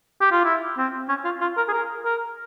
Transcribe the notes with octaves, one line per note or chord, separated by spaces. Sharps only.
G4
F4
E4
C4
C#4
F4
F4
A#4
G#4
A#4
A#4